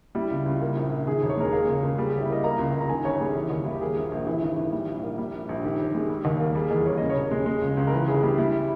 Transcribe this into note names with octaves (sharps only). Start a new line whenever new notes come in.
G3 E4
C#2
C#2
A#3
A#1
A#1
D#3 G#4
E1
C#5
G#3 A#4
A#3 G#4
C#2
C#2
G3 G#4
G1 G4
E4
A#3 D#5
A#3 A#5
C#2
C#2
A#5
D#3 G#5
G1 C#5
G3 G#4
E3
D#2
D#2 E4
G4
A#3 G#4
A#1
A#1
E3 E4
G#1
G#1
G3
A#1
A#3
G3
A#1
A#1
D#3 G4
G1
G#3
G3
D#2
A#3
G3 G#4
E2 G#4
A#3 C#5
C#3 D#5
C#5
E1
G#3
G#3
C#2
C#2
A#4
E3 B4
G1 G#4
G3 G4
G3 E4